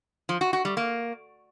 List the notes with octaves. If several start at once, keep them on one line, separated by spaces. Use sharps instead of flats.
F3
F#4
F#4
G3
A#3